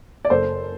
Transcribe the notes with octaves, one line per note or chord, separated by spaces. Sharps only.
D5
F#1 A4 C5